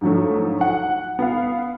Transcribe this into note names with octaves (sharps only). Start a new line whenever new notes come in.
G#2 D3 F3 F#3 A3
F#5
B3 F5